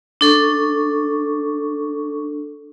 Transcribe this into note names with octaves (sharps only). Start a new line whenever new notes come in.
D4 A4 C#6